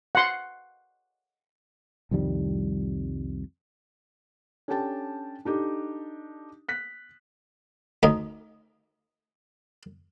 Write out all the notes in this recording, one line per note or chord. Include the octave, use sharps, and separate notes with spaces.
F#5 C6
C2 F2 D#3 G3
C#4 D4 G4 A4 G5 A5
D4 D#4 G4 A4
F#6 B6
D2 D#4